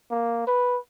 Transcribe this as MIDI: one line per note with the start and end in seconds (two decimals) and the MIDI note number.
0.11 0.44 58
0.47 0.78 71